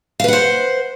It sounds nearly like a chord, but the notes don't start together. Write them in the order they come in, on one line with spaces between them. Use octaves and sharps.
F5 B4 F#5 C5